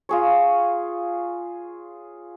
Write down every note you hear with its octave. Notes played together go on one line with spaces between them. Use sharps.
F4 G#4 C#5